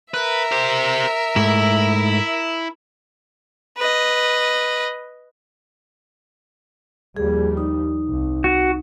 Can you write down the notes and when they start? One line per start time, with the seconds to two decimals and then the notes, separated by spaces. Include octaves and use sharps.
0.14 A#4 B4 E5
0.52 G4 C5
1.36 G#2 A3 E4
3.77 B4 D#5
7.17 D#2 F3 G3 G#4
7.57 D#4
8.07 C2
8.44 F#4